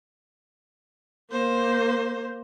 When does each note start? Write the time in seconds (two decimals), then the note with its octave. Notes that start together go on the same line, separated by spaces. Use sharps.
1.31 A#3 C5